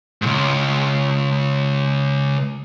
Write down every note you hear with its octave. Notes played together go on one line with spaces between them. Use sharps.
C#2 G#2